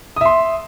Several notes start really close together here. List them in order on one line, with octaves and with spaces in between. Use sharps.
D#6 E5 C6